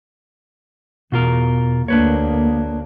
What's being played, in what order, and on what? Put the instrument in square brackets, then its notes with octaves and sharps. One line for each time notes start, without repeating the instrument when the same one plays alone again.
[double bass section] E2 [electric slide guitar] B2 F4 A#4
[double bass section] D2 A#3 [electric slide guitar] D4 B4 C#5